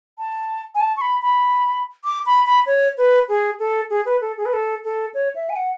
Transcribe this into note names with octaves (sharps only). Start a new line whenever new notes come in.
A5
G#5
A5
C#6
B5
B5
D6
B5
B5
C#5
B4
G#4
A4
G#4
B4
A4
G#4
B4
A4
A4
C#5
E5
G#5
F#5